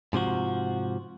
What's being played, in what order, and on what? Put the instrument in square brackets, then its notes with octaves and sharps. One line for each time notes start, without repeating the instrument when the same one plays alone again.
[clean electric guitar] G#2 C3 F3 F#4